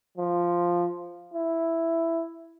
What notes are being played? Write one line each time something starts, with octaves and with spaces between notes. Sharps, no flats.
F3
E4